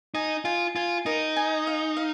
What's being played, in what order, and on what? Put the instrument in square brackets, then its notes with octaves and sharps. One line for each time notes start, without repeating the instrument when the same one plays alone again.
[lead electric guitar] D#4 [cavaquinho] G#5
[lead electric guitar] F4 [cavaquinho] G#5
[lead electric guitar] F4 [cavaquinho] G#5
[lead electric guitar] D#4 [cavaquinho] A#4
[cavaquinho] G#5
F5
F5